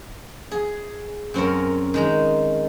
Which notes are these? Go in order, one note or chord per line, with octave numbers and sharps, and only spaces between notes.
G#4
F#2 C4 C#4 A#4
D#3 G#3 A#5